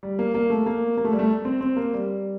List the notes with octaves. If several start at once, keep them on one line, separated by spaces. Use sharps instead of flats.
G3
A#3
A#3
A3
A#3
A#3
A3
G3
A3
C4
C4
A#3
G3